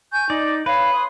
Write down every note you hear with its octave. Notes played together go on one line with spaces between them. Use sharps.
G#5 C#6 G6
D#4 D5
B4 C#5 F5
C6 D#6